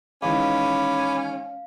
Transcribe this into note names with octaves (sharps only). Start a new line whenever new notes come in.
D#3 E3 G#3 C#4 F5 B5 D6